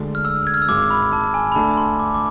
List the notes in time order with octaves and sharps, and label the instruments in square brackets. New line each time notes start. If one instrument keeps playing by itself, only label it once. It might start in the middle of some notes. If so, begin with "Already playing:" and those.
Already playing: [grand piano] D2 D3 G#3 D4
[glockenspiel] F6
E6
G#6
F6
E6
[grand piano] G#1 G#2 G#3 [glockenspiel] D6
[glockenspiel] B5
A5
G#5
B5
[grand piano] D2 D3 A3 D4 [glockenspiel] A5
[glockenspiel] C6
D6
D6